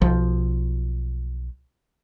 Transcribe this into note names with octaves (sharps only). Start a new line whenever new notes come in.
B1 F3